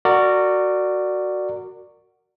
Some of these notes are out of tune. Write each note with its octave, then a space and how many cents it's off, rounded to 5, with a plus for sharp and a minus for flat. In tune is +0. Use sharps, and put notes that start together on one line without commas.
F#4 +0 A#4 -25 D5 +10